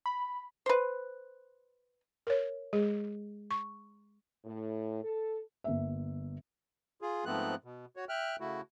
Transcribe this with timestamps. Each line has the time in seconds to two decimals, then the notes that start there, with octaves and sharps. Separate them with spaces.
0.06 B5
0.66 B4 C5
2.27 A#4 C#5
2.73 G#3 G#4
3.51 C#6
4.45 A2
5.04 A4
5.64 G1 A#3 E5
7.02 F4 G#4
7.25 G#2 F3 A3 B3 C4 F#6
7.64 B2
7.96 F#4 C#5
8.09 E5 G5 F6 F#6
8.40 C#3 A3 E4 F#4